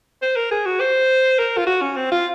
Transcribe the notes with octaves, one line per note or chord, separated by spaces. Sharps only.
C5
A#4
G#4
F#4
C5
A#4
F4
F#4
C#4
C4
F4